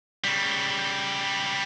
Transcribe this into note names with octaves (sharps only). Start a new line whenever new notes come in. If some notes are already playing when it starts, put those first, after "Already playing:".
C#3 G3